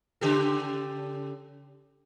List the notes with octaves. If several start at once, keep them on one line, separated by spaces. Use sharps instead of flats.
C#3 G4 A4